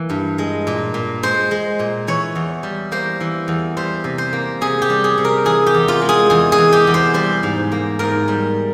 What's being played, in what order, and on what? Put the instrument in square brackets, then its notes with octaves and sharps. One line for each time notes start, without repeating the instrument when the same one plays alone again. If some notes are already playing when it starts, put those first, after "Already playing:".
Already playing: [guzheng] E3 A#3
G2
G#3
A#2
A#2
G#3 C5
G#3
A#2
E3 C#5
E2
G3
A#3 C5
E3
E2
G3 C5
C3
C5
A#3
C3 G#4
G4
G3
G#4
C3
A#4
E3 G#4
G4
E2
F4
G#3
G#4
E2 G#4
G#4
E3
G4
E2
C5
G3 C5
G#2
A#3
G#2 A#4
G3